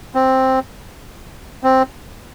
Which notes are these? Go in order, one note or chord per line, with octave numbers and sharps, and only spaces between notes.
C4
C4